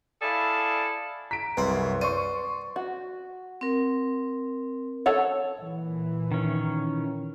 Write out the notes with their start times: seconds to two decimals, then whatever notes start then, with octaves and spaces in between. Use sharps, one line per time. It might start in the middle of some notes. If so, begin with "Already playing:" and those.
0.21 E4 G#4 A4 D5 F5
1.31 A#5 B6 D7
1.57 C2 F#2 C#3 B4 F#5 C6
2.01 C5 D5 C6 C#6 D#7
2.76 F#4
3.61 C4 A#4
5.06 A4 C#5 F#5
5.59 A#2 E3
6.32 D#3 C#4